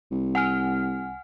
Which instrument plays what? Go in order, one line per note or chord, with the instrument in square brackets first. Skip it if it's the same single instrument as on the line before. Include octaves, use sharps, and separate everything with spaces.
[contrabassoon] C2
[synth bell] F#5 G#5 F6